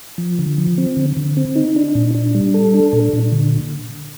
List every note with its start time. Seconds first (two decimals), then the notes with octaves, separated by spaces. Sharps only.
0.18 F3
0.39 D3
0.58 F3
0.78 C4
0.97 D3
1.17 D3
1.37 C4
1.55 D#4
1.76 D4
1.95 A#2
2.15 D4
2.35 G3
2.54 A4
2.74 D4
2.93 A#2
3.13 A#2
3.32 D3